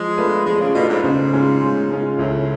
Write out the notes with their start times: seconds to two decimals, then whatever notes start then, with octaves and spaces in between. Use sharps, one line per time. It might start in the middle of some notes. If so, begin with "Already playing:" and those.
Already playing: F3 G#3
0.17 A3 D4 F4 B4
0.46 F3 G#3
0.61 C#3
0.75 B2 A3 D4 F4 B4
0.89 G#2
1.04 G#2 C#3
1.33 G#3 C#4 F4
1.62 C#3
1.90 G#3 C#4 F4
2.19 C#2 A2